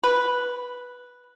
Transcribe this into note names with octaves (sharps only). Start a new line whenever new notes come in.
B4